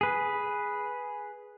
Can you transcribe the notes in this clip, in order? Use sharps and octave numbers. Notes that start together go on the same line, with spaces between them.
G#4 B4